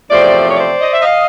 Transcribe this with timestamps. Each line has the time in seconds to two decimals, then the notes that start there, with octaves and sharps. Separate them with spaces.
0.10 E2 C3 F3 A3 C4 C5 D5
0.46 C#5
0.56 C5 D5
0.81 D#5
0.92 E5
1.02 D#5 F5